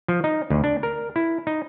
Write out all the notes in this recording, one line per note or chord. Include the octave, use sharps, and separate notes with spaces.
F3
D#4
D2
D4
A#4
E4
D#4